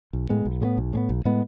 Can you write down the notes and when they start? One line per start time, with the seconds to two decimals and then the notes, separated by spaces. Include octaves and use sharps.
0.13 B1
0.29 A2 G#3 B3
0.45 B1
0.62 A2 G#3 B3
0.77 B1
0.93 A2 G#3 B3
1.09 B1
1.25 A2 G#3 B3